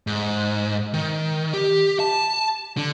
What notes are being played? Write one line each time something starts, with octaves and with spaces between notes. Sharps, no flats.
G#2
D#3
G4
A5
D3